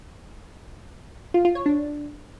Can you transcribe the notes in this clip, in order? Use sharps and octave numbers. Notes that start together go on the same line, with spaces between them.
F4
F4
C#5
D4